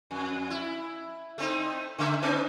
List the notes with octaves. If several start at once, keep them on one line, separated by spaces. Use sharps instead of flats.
F2
E4
A3 C4 D#4
C#3 A3 E5
B3 C#4 D#4